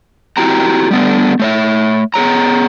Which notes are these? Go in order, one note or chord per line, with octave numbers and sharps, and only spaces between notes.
C4 E4 F#4 G4 G5 A#5
G3 A3 B3 D4
A3 C#5 E5
B3 G#4 C#5 A#5